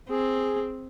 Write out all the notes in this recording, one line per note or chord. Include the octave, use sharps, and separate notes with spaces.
C4 G#4